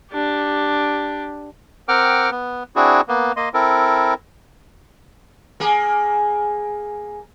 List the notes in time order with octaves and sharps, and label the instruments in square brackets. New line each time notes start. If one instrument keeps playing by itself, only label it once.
[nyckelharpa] D4 G4
[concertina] C4 A#4 F#5 G5 D6 F6
B3
C4 D4 E4 F#4 G#4
A#3 B3
A#3 D#5 C6
C4 E4 A4 A#4
[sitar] A#3 G#4